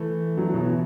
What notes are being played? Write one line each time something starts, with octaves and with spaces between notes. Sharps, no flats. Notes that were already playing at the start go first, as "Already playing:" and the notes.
Already playing: E3 A3
D3 F#3
B2 E3